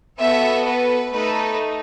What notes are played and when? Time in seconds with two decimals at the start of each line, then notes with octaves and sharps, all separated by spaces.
0.18 B3 F#4 A4 E5
0.65 B4
1.12 A3 D#4 A4 B4